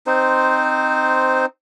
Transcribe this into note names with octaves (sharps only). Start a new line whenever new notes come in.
C4 D#4 C5